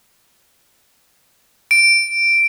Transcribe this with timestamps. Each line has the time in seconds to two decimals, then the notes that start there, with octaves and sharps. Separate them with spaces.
1.71 D7